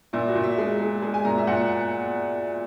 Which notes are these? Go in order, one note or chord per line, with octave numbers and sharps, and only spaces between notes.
A#2 E4
F#4
A#2
E5
G#3
G#3
G#3
G#5
A#2 A#5
E5
A#2 F#5